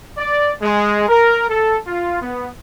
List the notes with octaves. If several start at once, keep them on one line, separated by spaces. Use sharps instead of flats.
D5
G#3
A#4
A4
F4
B3